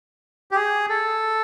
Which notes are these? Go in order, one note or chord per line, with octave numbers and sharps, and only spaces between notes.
G4
G#4
A4